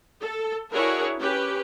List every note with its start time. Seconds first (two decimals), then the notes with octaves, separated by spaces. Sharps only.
0.22 A4
0.72 D4 E4 F#4 G#4 A#4 C#5
1.20 C#4 G4 B4